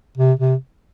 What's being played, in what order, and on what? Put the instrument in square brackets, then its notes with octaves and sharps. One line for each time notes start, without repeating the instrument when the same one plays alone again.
[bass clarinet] C3
C3